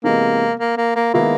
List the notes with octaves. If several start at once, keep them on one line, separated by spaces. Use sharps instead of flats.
C3 E3 G#3 A#3 B3
A#3
A#3
A#3
D#3 G#3 A#3 B3 E4